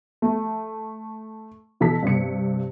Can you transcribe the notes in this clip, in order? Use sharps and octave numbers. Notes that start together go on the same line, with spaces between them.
A3
B2 E3 A4 A#5 B6
G2 C3 C#7